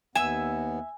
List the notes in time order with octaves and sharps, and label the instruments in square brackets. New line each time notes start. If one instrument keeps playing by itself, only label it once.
[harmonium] D#2 B3 [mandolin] E5 E6 [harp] G#5